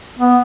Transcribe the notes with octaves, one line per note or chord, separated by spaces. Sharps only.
B3